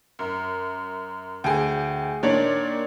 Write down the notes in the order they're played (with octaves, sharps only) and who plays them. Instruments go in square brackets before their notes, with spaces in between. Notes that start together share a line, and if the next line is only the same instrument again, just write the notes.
[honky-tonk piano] F#2
[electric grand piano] D2 [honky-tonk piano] G#4 G5
[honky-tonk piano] A#2 D#3 [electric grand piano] D4 C#5 D5